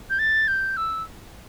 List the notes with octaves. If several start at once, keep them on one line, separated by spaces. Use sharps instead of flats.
G6
A6
G6
E6